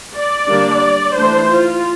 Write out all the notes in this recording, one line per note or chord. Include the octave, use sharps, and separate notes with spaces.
D5
D3 G3 A#3 D4
E3 A3 D4 C5
F4